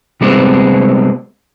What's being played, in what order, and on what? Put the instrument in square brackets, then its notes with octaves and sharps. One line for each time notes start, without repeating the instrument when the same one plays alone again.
[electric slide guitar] C3 G3 G#3 B3 C4